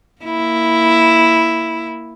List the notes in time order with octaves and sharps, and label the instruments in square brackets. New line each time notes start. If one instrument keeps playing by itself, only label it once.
[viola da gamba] A#3 E4